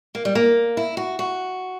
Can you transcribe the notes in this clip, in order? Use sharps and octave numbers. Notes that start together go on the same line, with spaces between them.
A#3
G3
A#3
E4
F#4
F#4